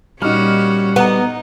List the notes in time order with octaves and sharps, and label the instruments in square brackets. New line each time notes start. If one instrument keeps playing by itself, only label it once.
[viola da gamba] A#2 C#4 F#4 [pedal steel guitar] G3 [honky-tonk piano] D#4 F6
[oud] B3 [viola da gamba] D#4 [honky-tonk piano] F#5 A#5